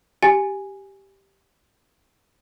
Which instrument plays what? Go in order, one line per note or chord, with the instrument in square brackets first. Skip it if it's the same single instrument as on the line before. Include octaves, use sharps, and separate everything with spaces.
[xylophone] G4 G#5 A6